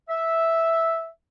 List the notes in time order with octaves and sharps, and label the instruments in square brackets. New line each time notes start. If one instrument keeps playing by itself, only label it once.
[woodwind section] E5